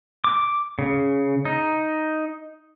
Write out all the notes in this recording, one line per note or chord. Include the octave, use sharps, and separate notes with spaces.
D6
C#3
D#4